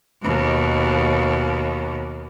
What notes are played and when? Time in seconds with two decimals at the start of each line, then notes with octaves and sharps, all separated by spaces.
0.23 D#2 B2